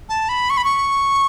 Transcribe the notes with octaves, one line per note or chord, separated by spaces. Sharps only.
A5
B5
C#6
B5
C#6